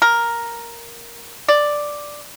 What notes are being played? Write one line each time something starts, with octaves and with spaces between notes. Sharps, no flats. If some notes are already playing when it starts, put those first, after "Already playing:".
A#4
D5